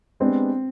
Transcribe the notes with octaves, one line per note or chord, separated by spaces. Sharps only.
G#3 B3 C4 D4 G4